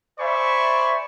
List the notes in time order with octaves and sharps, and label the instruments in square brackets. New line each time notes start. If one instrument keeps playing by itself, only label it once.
[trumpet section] C5 D5 E5 G#5 B5 C#6